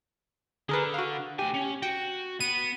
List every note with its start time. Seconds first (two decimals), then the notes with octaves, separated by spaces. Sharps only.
0.69 D3 G#4 A#4 B4
0.94 F#4 F5
1.39 D2 G4 G#5
1.54 C#4
1.82 F#4 G5
2.40 B3 D#7